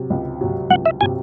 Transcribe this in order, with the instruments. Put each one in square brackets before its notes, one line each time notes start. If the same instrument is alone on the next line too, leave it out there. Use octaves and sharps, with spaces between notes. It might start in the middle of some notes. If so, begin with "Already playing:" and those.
Already playing: [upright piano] C3 F#3
C#2
C3 F#3
[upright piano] C#2 [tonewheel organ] F#5
[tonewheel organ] E5
[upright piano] C3 F#3 [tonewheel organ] G#5